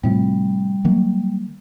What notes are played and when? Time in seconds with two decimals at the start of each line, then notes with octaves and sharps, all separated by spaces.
0.03 A2 C3 F3 G3
0.85 D#3 F#3 A#3